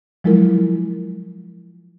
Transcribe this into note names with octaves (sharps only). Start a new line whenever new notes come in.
F3 F#3 G#3 E4 F4 A#4